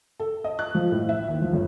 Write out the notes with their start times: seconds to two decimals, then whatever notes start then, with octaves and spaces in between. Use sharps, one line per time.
0.20 A4
0.44 D#5
0.59 F#6
0.75 F3
0.92 A2
1.09 E5
1.28 D#2
1.42 F3
1.53 G1